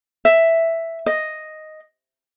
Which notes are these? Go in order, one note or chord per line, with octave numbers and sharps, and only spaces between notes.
E5
D#5